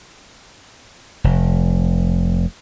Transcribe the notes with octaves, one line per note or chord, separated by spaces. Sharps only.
F1